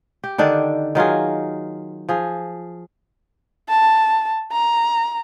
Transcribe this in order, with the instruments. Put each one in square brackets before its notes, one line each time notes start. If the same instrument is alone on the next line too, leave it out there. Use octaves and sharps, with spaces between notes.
[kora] G4
D3 D#3 D4 D5
D#3 F#3 F4 G#4
F3 G#4
[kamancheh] A5
A#5